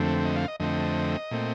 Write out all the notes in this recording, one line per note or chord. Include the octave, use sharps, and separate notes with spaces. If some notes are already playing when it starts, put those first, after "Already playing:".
Already playing: F2 D3 A3 C4
D#5
F5
D#5
F2 D3 A3 C4 D#5
A#2 A3 C4